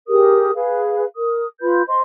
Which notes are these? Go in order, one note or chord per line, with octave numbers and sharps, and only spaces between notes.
G4 G#4 A#4 D#6
G#4 B4 F5
A#4 D#6
F4 B4 B5 G6
C5 D#5 C6